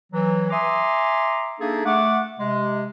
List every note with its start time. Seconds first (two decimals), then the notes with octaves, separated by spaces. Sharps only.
0.12 E3 F#3
0.50 E5 G#5 A#5 C6 D6 D#6
1.59 A#3 D4 D#4 G#4 A4 E5
1.84 A3 F#5 D6
2.38 C3 G#3